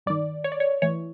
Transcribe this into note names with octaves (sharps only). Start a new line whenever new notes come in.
G2 D#3 D5
C#5
D5
C#5
A2 E3 C#5